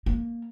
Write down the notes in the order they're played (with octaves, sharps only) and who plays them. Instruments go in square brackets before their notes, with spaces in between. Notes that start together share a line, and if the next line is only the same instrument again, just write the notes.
[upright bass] A#3